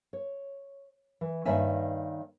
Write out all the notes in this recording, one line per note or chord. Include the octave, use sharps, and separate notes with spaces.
C#5
E3
G2 D#3 A#3 C#5 E5 G#5